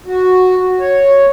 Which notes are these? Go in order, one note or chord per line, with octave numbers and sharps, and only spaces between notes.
F#4
C#5